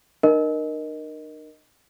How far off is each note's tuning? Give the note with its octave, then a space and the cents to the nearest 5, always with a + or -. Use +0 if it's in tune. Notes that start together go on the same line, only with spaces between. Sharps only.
D#4 -45 A#4 +10 D#5 +0